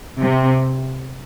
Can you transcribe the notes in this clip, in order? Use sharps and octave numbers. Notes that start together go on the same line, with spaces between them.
C3